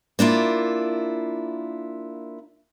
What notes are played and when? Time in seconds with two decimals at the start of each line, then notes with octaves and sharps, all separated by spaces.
0.19 A#3 D4 E4 F4